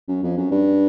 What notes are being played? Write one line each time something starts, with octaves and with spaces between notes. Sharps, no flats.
F#2
F2
F#2
G2